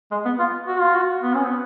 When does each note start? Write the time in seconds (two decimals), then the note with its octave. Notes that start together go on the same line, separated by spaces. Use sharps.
0.11 G#3
0.25 B3
0.39 F4
0.67 F#4
0.80 F4
0.95 F#4
1.23 B3
1.34 C#4
1.46 B3